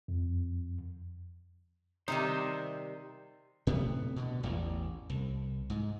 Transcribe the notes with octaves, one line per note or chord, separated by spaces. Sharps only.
F2
C3 D#3 G3 D#4 C5 E5
A2 C3 B3
B2 D3
A1 E2
C2
G#2